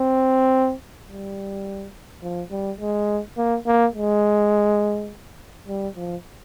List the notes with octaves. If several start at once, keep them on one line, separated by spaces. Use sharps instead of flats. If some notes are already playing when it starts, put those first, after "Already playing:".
Already playing: C4
G3
F3
G3
G#3
A#3
A#3
G#3
G3
F3